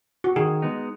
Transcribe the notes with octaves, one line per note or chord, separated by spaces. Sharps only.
F#4
D#3 G#4
G#3 B3 D#4